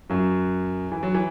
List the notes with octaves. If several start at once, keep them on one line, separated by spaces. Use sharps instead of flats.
F#2 F#3
E3
F#3
E3